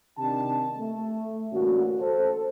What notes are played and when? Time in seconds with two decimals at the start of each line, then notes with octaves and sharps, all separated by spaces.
0.18 C3 D#3 D4 G4 A5
0.77 A3
1.52 A1 D2 G3 A#3 C#4 F#4
1.99 A4 C5